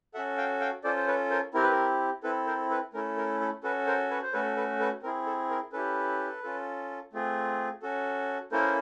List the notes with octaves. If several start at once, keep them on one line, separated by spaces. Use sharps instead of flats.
C#4 F#4 A4 E5 F#5
F5 G5
F5 G5
C#4 F4 A4 C5 D5
C5
B4 C#5
A#4 C5
C4 E4 G4 A#4
B4
A#4
C4 E4 A4 B4
A#4 C5
A4 B4
A3 C#4 E4 A4 A#4
A#4
A4
C#4 F#4 A4 B4
A#4 C5
B4 C#5
C5
A3 C#4 F#4 A4 B4 C#5
A4 B4
A4 B4
C4 E4 G#4 A#4
A4
A#4
C#4 E4 G4 A4 B4
C#4 F4 A4
A3 C4 F4 G#4
C#4 F#4 A4
A#3 C#4 E4 A4 A#4 C5